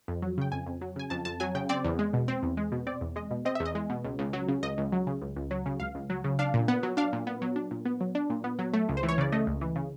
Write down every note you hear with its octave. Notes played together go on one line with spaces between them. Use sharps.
F2
F#3
C#3 G5
F2 G#5
F2
F#3
C#3 G#5
F2 A5
F2 A5
F#3 G#5
C#3 G5
C4 D5
E2
G#3
B2
C4
E2
G#3
B2
C4 D5
E2
G#3 D#5
B2
C4 D#5
E2 E5
D#5
G#3
B2
C#2
C#2
F#3
C#3
C#2 D#5
C#2
F#3
C#3
C#2
C#2
F#3
C#3
C#2 F5
C#2
F#3
C#3
D4 F5
A#2
B3 F#5
F#3
D4 F5
A#2
B3
F#3
D4
A#2
B3
F#3
D4
A#2
B3
F#3
A3
C#2
C5
E3
C#5
C#3 D5
A3 D#5
C#2
E3
C#3